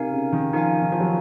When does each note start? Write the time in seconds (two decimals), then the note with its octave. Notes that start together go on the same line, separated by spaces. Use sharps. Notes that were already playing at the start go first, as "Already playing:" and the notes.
Already playing: C3 D#4 A#4 F5 G#5
0.12 C#3
0.33 D#3
0.53 F3 D#4 A#4 F5 G#5
0.82 D#3
0.92 F3
1.00 F#3